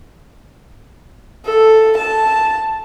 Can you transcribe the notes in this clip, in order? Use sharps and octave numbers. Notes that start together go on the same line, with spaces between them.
A4
A5